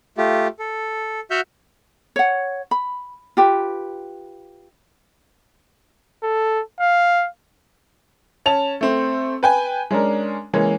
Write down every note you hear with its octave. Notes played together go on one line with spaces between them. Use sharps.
A3 F4 G4
A4
F#4 E5 F#5 F6 G6
C#5 F#5
B5
F4 G4 B4
A4
F5
C#4 A5 F7
A3 C4
B4 G5 G#5
G#3 C#4 D4 A#4
E3 G#3 A#3 C#4